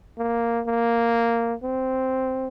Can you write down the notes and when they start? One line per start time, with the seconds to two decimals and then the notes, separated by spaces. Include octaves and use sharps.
0.18 A#3
0.67 A#3
1.63 C4